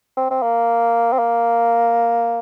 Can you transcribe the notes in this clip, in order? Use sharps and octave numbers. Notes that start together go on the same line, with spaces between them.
C4
C4
A#3
C4
A#3